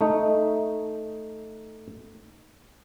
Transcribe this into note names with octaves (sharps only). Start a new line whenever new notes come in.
A3 D#4